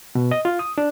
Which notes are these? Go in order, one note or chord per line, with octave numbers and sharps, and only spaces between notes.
B2
D#5
F4
D#6
D4